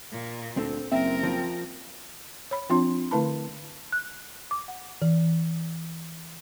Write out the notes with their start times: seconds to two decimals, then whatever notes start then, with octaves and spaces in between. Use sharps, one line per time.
0.12 A#2
0.57 D2 C4 A4
0.92 F#1 C4 A#4 E5
1.23 F3 F4
2.51 C#5 B5
2.69 F3 C4 D4 F4 C6
3.11 D3 A3 E4 B4 A5 B5
3.92 F#6
4.51 D6
4.68 F#5
5.02 E3